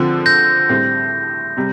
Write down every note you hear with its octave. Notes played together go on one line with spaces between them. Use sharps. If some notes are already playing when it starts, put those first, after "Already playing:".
Already playing: D3 F3 C4
G6 A#6
A2 G3 C4
C3 G3